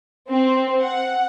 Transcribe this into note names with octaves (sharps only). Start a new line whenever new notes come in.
C4
F#5